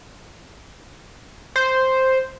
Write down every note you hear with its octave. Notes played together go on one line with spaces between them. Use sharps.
C5